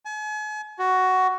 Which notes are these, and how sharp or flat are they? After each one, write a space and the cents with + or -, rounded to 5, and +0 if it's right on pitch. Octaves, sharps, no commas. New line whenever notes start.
G#5 +40
F#4 +10